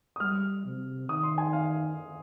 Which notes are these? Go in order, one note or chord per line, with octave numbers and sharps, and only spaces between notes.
D#6
G3 F6
C3
D#3 D#6
C6
G#5
F5